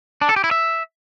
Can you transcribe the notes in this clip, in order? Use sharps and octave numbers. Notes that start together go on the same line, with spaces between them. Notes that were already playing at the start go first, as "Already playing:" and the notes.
D4
A4
G4
E4
E5